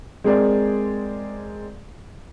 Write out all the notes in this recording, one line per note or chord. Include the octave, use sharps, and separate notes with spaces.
G#3 C4 G#4 A#4 D5